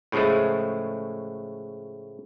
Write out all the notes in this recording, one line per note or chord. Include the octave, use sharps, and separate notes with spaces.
A2 C#3 F3 G#3 A3